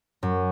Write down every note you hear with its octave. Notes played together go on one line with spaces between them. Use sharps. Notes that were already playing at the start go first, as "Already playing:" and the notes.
F#2